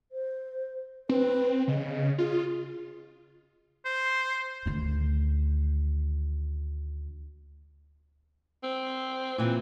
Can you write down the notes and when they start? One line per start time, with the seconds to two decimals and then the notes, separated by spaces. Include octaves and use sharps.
0.12 C5
1.09 C4 B4
1.68 C#3 D#5
2.18 F4 G#4
3.85 C5
4.66 D2 D#3
8.63 C4
9.38 A#2 E3 C4